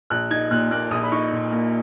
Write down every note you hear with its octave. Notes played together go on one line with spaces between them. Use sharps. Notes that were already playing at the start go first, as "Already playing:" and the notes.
A#1 F#6
D#4 G#6
A#2 F#6
A#3 F#6
A#1 D#6
B5
D#4 C#6
A#2
A#3